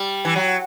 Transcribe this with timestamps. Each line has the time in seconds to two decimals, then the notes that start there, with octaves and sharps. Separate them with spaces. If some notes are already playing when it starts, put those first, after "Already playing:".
Already playing: G3
0.25 E3
0.36 F#3